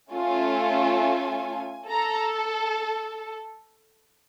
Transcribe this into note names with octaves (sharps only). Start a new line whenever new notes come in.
A3 C#4 F4 A4 G#5
A4 A#5